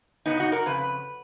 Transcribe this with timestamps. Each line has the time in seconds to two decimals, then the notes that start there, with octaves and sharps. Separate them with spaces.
0.26 F#2 C#3 F#3 B3 D#4
0.40 D#4 F#4
0.52 F#4 A#4
0.66 F2 C#3 B4